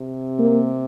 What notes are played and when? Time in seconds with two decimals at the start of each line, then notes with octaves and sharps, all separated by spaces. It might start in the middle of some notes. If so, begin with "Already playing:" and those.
Already playing: C3
0.39 A#3